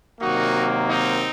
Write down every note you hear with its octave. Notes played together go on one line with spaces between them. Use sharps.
C3 D#3 F#3 A#3 D#4 F#4
C4 D#4